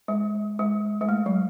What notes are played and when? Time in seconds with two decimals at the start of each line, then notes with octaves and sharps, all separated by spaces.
0.08 G#3
0.59 G#3
1.01 G#3
1.09 A3
1.26 F#3